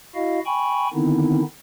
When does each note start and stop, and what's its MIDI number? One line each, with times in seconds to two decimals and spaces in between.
0.15 0.40 64
0.15 0.40 66
0.15 0.40 75
0.15 0.40 77
0.46 0.88 79
0.46 0.88 80
0.46 0.88 83
0.46 0.88 85
0.94 1.42 50
0.94 1.42 51
0.94 1.42 59
0.94 1.42 60
0.94 1.42 63
0.94 1.42 64